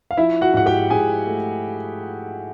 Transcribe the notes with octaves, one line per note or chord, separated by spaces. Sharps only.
F5
F3 E4 E5
F#4 F#5
G#2 F#5
G4 G5
G#2 G#4 G#5
A3